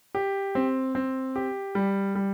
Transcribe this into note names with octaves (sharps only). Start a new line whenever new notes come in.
G4
C4
C4
G4
G3
G3